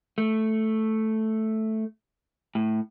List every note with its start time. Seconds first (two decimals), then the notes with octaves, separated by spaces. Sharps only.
0.18 A3
2.55 A2